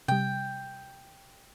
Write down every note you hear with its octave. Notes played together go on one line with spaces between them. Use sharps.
C3 G3 G5